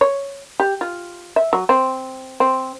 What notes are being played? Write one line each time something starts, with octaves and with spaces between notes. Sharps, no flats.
C#5
G4
F4
E5
F#3
C4
C4